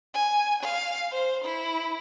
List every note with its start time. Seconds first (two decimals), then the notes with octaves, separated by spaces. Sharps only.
0.14 G#5
0.63 F5
1.11 C5
1.45 E4